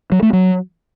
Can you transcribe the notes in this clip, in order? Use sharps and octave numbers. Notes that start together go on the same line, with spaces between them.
F#3
A3
F#3